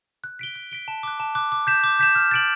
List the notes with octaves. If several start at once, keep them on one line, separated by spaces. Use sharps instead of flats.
F#6
B6 D7 G7
F#6
B6 D7 G7
A5
D6 F#6
A5
D6 F#6
D6
G6 B6 E7
D6
G6 B6 E7
F6
A6 D7 F#7